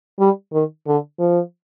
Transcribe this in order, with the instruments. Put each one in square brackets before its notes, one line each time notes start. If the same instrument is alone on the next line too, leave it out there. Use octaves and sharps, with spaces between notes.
[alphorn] G3
D#3
D3
F3